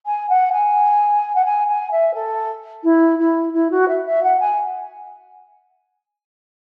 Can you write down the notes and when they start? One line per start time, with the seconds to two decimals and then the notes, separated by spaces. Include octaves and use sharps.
0.06 G#5
0.29 F#5
0.52 G#5
1.35 F#5
1.45 G#5
1.68 G#5
1.91 E5
2.14 A4
2.83 E4
3.18 E4
3.53 E4
3.70 F#4
3.88 E5
4.05 E5
4.23 F#5
4.40 G#5